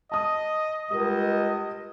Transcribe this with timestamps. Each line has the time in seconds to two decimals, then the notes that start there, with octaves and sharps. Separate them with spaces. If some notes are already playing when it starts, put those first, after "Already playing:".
0.12 D#5 A5 D#6
0.90 C#2 G3 A#4 D#5